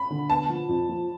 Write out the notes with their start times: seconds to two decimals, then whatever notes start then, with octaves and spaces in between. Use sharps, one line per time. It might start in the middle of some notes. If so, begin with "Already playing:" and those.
Already playing: B5
0.10 D3
0.30 B3 A5
0.49 F3
0.69 F2
0.89 F3